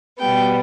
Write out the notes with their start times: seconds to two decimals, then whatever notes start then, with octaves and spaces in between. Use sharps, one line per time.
0.19 B2 G3 B3 G5